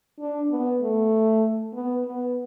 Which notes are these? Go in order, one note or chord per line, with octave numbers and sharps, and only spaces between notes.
D4
B3
A3
B3
B3